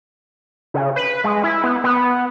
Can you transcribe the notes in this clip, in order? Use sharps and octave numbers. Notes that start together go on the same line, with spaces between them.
C#3
B4
G#3
E4
B3
B3